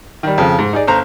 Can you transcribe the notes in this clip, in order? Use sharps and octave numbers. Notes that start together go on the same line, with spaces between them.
D#3 G3
F2 C#3 F3
G#2
D#4 G#4 D5
G1 C5 A#5